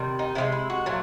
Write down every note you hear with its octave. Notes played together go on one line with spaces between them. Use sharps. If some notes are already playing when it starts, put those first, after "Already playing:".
Already playing: C3 D#3 G3
D#4
C3 F3 G#3 E4
E4
F#4
A#2 F#3 A3